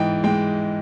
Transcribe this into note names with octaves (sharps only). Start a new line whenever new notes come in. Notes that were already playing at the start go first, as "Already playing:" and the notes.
Already playing: G#2 E3 D#5 G5
G#3 G5